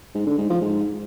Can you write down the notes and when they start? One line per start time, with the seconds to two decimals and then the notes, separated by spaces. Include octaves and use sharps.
0.15 G#2
0.26 D3
0.38 G#2
0.50 F3
0.61 G#2